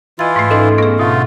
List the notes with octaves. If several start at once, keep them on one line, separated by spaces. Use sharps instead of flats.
E3 E4 F4 D#5 A6
G#2 A3
C#4 D#4 A4 D#5 C6 D6
B3 G#4 C#6 F6 A#6
B2 D3 A3 F4